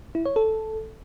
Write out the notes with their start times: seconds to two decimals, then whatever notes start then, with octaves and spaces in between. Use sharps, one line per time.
0.15 E4
0.26 C#5
0.36 A4